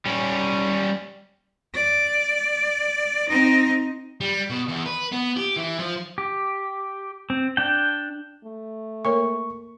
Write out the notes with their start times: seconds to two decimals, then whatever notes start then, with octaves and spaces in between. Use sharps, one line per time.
0.06 G3 C#4
1.74 D5
3.29 C4 D#4
4.21 G3
4.50 B2
4.69 E2
4.86 B4
5.12 B3
5.37 G4
5.57 E3
5.79 F3
6.18 G4
7.30 C4
7.57 D4 G5
8.45 A3
9.05 A#3 A#4 C#5 C#6